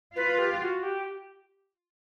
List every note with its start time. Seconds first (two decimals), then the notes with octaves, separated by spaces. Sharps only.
0.16 F4 B4
0.39 G4
0.60 F#4
0.83 G4